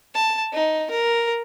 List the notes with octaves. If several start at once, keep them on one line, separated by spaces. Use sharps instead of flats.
A5
D#4
A#4